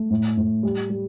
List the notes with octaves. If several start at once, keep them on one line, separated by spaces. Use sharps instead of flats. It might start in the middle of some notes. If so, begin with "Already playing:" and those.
Already playing: A3
A2
A2
G3
G3